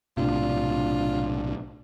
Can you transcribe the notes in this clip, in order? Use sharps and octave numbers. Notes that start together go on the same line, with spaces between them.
B1 A2 C3 D4 F4